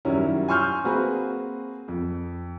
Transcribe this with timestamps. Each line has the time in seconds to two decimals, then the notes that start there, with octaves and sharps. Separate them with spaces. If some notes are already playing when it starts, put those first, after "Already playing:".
0.05 F#2 D#3 F#3 G3 C#4 E4
0.48 G#5 C6 C#6 E6 F6 G6
0.84 A#3 C4 F#4 G#4 B4
1.88 F2